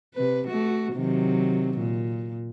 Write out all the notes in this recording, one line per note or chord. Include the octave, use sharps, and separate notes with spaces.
C3 B4
A3 F#4
C3 D#3 F#3
A#2